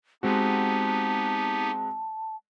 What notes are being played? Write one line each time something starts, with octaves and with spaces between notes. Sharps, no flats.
G#3 B3 C4 D#4 F#4 G4 A5